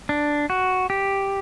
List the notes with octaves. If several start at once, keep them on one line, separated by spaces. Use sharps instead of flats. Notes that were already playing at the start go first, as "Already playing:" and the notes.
D4
F#4
G4